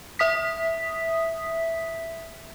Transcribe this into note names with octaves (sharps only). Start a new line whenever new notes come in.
E5 D#6 B6